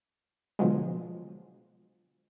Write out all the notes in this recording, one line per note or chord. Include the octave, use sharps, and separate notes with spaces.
B2 D3 F3 F#3 G#3